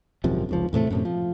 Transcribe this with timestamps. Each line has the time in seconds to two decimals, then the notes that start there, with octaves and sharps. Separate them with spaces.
0.24 G#1 F#2 C3 F3
0.49 F1 C#2 F3
0.73 E2 A2 C3 A3
0.90 F#2 A2 C3
1.05 F3